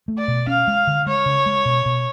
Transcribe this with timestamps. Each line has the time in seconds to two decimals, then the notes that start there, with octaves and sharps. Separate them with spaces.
0.08 A3
0.18 D5
0.28 B2
0.47 C#4 F5
0.68 G#3
0.87 D3
1.06 G#3 C#5
1.26 C#3
1.46 G#3
1.65 B2
1.86 B2